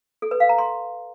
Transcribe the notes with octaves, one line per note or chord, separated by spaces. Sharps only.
A4
B4
F5
A#5
C6